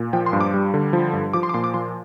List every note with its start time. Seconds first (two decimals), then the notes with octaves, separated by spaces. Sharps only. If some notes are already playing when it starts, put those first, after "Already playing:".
Already playing: A#2
0.13 F3 G5
0.26 C6
0.33 G2
0.40 D6
0.54 G3
0.74 D3
0.93 F3
1.13 G2
1.33 F3 D6
1.43 C6
1.49 D6
1.54 A#2 C6
1.64 D6
1.74 F3 C6